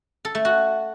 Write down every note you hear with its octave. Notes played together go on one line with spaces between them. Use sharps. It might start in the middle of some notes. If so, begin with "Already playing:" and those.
A4
A3
F#4